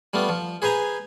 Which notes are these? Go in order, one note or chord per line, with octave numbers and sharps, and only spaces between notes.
G3 A3 B3 F4
F3
G#4 B4 C5 G#5 A#5